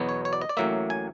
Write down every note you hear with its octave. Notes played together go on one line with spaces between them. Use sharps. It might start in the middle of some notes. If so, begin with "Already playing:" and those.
Already playing: E2 B2 F#3 B3
C#5
C#5
D5
D#5
D5
A1 A2 F#3 A#3 E5
G#5